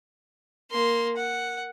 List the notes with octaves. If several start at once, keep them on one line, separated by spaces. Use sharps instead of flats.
A#3 C6
F#5